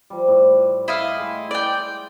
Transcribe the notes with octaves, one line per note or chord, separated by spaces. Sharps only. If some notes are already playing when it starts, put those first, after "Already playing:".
F3 G3
A2 G3
E4 D#5 F5
G#3
D5 G5